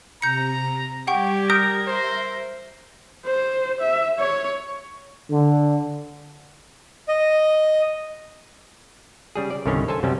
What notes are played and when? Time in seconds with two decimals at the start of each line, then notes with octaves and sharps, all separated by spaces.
0.22 C3 A#5 G6 C#7
1.07 G3 G4 F#5 G5 C#6 G#6
1.50 A#4 D#6 G6 D7
1.87 C5 E5
3.25 C5
3.80 E5
4.19 C#5
5.30 D3
7.08 D#5
9.36 C#3 G3 G#4
9.51 D5
9.66 C2 G2 D3 D#3 C#4 C#5
9.88 A4 C5 G#5 A5
10.03 F#2 C3 G3 C#4